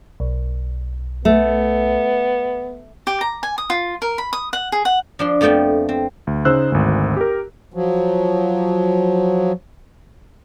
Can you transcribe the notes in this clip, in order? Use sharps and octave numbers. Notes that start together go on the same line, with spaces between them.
B1
A3 B3
G4
A#5
G#5
D#6
F4
A#4
B5
D#6
F#5
G#4
F#5
F3 D4 C6
F2 F3 A3 B3 G5
C4
D2
C#3 D#4 C5 E6 F#6
G#1 D2
G4 A#4
F3 F#3